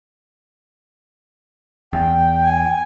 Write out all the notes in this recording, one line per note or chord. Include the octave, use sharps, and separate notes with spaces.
E2 G5
G#5